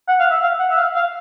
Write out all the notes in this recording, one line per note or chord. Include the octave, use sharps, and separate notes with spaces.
F#5
F5
E5
F5
F#5
E5
F5
F5